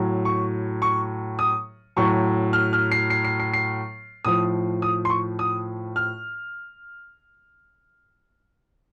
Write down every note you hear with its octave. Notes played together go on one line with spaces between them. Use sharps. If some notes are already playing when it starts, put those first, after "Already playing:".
Already playing: A2 F#3
C#6
C#6
D#6
A2 F#3 C#6
F6
F6
C7
C7
C7
C7
C7
A2 F3 D#6
D#6
C6
C#6
D#6
F6